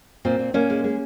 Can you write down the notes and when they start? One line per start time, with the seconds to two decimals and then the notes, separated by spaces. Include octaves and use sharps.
0.25 A#2 C4
0.39 A#2
0.54 A#2 A#3 C#4
0.70 G#3
0.84 G#3